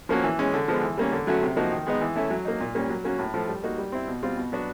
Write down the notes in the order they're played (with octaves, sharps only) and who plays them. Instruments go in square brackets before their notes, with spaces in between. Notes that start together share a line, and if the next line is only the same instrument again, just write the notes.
[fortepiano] F3 A#3 C#4 F#4
E3
G#3 C#4
D3
F3 G#3 B3
E3
G3 A#3 C#4
D3
F#3 A3 C#4 F#4
C3
F3 A#3 D#4 F#4
D#3
G#3 B3 D#4
E3
A3 C#4 E4
F#3
A#3 D#4
A#2
G3 A#3 C#4
F#3
A#3 C#4 F#4
A2
F3 A3
G3
A#3 D#4 F#4
G3
C4 E4
B2
G3 C4 F4
B2
F#3 B3 D4 F#4